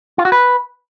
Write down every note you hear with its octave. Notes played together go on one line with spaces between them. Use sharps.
F4
F#4
B4